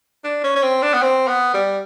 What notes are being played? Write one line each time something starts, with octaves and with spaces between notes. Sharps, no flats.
D4
C#4
C#4
C4
D4
B3
C4
B3
G3